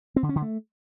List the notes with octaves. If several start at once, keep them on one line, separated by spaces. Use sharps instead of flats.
C4
D3
C#4
D3
A3